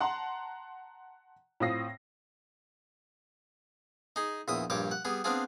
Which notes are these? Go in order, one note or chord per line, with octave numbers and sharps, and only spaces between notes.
F#5 A5 A#5 C6
A2 C4 F4 D#6 A#6 C7
D#4 G#4
A#1 E2 E5 D#6
A#1 G2 G3 C#5 D6
F#5
G3 B3 G#4
B3 C4 D4 F4 G#4